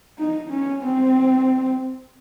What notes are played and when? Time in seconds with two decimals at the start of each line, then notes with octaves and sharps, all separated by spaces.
0.18 D#4
0.50 C#4
0.82 C4